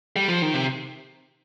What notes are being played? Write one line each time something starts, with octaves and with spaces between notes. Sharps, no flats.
G3
F3
D#3
C3